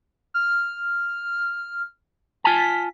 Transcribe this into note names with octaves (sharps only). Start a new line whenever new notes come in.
F6
F4 G#5 A5 B6